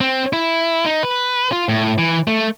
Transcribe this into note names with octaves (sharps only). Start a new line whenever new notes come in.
C4
E4
D#4
B4
F4
A2
E3
A3